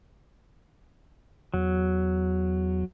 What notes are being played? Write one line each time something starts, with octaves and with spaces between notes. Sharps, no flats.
E2 F#3